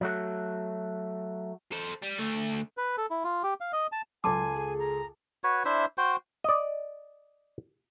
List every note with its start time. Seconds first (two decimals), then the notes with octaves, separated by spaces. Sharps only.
0.01 F#3 A3 F#4
1.72 A4 C5
2.03 G3
2.19 D2 A3
2.77 B4
2.97 A4
3.11 E4
3.24 F4
3.43 G4
3.60 F5
3.73 D#5
3.92 A5
4.24 C#2 F#3 A4 G#5 A5 C6 D6
4.56 G#4
4.79 A#5
5.44 F#4 B4 C#5
5.65 D4 E4 C5 E5
5.98 F#4 C5 G5
6.44 D5 D#5